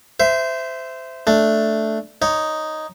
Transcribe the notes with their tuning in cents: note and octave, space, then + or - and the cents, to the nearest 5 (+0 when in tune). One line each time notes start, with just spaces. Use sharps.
C5 -20 E5 +10
A3 +0 D4 +0
D#4 +0 C#5 +0